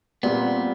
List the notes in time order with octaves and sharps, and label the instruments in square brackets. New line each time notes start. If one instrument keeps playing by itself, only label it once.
[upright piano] A#2 G3 C4 [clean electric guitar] B3